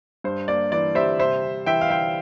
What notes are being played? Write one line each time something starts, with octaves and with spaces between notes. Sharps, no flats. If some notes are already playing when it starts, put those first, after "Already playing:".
G2 C5
A#3 D5
E3 D5
G3 C5 E5
C3 C5 E5
C3
E3 E5 G5
F5
G3 E5 G5